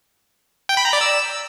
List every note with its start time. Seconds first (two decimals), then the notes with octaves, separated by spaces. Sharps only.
0.69 G5
0.77 B5
0.85 A#5
0.93 D5
1.01 E6